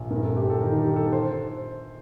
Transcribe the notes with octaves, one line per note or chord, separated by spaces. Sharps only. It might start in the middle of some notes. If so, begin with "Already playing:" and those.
Already playing: A#1
G2 A#4
A4
G1 G4
A4
D#3 A#4
G4
G1
A4
C5